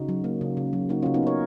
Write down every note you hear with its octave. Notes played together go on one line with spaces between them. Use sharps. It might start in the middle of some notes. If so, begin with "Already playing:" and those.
Already playing: C#3 D#4 F#4
F#3
A#3
C#3
C#3
F#3
A#3 D#4 F#4
C#3 C#4 F4
B3 D#4
C#3 A#4 C#5